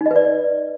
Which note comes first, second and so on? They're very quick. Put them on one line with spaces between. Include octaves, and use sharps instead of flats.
D#4 D#5 B4 D5